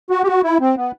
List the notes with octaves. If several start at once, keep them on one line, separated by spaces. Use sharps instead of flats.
F#4
G4
F#4
E4
C4
B3